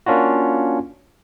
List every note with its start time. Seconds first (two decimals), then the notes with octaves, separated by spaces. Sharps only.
0.06 A#3 C#4 D4 F4 F#4